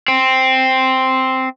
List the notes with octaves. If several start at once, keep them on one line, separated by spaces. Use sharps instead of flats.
C4